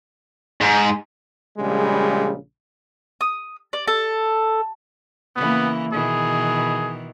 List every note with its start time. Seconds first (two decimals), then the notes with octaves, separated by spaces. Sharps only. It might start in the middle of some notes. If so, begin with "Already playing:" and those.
0.61 G#2
1.58 A#1 C#3 G3 G#3
3.21 D#6
3.73 D5
3.88 A4
5.36 C#3 E3 A#3 B3
5.92 B2 D#3 E3 G#4